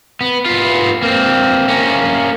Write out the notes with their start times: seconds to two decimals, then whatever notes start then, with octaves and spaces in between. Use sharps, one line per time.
0.21 B3
0.46 B3 F4
1.02 A#3 C4
1.68 A#3 C#4